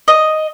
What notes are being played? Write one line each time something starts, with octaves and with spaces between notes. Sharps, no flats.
D#5